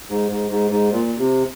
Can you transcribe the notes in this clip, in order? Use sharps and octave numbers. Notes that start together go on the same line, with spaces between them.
G#2
G#2
G#2
G#2
A#2
C3